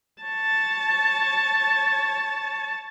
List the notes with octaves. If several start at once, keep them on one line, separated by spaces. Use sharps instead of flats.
C#5 A5